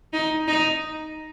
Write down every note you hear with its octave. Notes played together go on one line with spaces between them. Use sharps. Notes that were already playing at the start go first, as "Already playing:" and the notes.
D#4
D#4